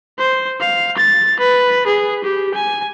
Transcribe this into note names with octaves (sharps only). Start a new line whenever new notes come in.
C5
F5
A6
B4
G#4
G4
G#5